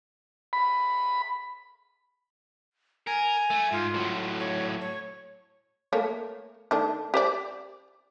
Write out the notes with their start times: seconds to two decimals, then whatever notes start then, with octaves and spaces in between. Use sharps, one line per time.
0.53 B5
3.07 A#4 G#5
3.50 A3
3.72 G#2 F4
3.94 A2 F#3
4.40 C#5
4.81 C#5
5.93 A3 A#3 C#5
6.71 D#3 A3 D4
7.14 G4 C5 D5